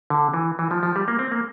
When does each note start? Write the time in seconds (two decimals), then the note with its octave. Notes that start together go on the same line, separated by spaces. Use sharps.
0.10 D3
0.34 E3
0.59 E3
0.71 F3
0.83 F3
0.96 G3
1.08 A#3
1.19 C4
1.32 A#3